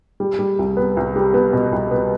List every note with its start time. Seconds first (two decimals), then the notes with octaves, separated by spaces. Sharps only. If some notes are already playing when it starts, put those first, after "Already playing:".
0.20 G3
0.39 G3
0.59 C2
0.77 B3
0.97 C2
1.16 G3
1.34 B3
1.53 B2
1.72 C2
1.91 B3